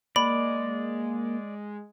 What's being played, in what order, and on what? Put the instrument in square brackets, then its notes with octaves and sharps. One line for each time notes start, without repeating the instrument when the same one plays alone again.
[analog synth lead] G#3 [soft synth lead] A#3 [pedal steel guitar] D5 [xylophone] B5